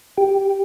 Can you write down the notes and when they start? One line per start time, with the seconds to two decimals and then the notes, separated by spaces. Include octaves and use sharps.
0.17 G4